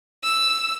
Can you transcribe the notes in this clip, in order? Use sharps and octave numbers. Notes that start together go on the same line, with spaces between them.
E6